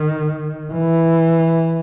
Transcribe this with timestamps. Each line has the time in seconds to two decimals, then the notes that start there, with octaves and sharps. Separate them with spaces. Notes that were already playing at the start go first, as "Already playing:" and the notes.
Already playing: D#3
0.73 E3